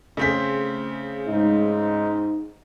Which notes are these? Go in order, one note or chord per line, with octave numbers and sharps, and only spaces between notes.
C#3 A3 C4 G#4 B6
G#2 D#4